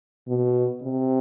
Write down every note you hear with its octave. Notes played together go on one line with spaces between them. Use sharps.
B2
C3